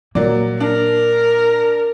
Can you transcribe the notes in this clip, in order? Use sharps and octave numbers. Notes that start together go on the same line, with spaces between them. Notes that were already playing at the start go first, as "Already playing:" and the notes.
A#2 F#3 A#3 D5
D4 A#4